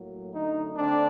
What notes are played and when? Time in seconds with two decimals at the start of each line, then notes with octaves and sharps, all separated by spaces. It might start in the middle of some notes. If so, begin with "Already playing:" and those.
Already playing: A2 F#3 A#3
0.33 F#2 D3 A3 D#4
0.76 D3 A3 C4 D4